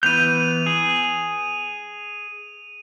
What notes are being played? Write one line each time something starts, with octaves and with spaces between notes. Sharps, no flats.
E3 B3 G6 D#7 F7
G#4